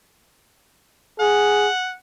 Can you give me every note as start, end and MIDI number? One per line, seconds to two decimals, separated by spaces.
1.20 1.69 68
1.20 1.93 78